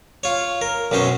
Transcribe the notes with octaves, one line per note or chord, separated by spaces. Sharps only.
F4 C#5
A#4
B1 F#2 B2 C#4 C5